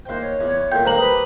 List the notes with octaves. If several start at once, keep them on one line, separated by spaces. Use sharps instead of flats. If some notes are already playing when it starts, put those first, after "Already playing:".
D#2 C5 G5
C#5
E2 D5
F2 A#2 G5 G6
D#2 G3 A#3 C5 A#5 F#7
G4 B4 D#6